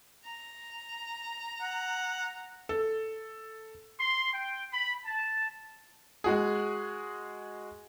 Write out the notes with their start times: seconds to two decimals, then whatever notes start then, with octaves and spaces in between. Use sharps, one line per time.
0.25 A#5
1.62 F#5
2.69 A4
4.00 C6
4.34 G5
4.73 B5
5.06 A5
6.24 G#3 F#4 G#4